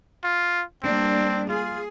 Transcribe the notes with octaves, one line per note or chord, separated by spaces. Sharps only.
F4
G3 A#3 C4 D4
F4 G#4